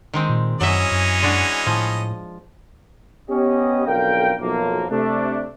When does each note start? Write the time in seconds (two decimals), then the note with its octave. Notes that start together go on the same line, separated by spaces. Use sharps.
0.14 D#3 G#3 C4
0.29 A#2
0.61 F#2 E3 F#3 C#4 D#5 E5
0.91 F#2
1.22 G#3 D4 F#4
1.67 A2 F3
3.30 B3 C#4 G4 D#5
3.87 B1 F2 D3 A#4 F5 G5
4.40 B1 F#2 F3 A#3
4.90 C3 A3 D4